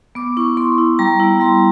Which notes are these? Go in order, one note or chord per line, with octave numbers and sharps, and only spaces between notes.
B3 D6
E4 C#6
B3 C6
E4
G3 A#5
B3 E4
G3 C6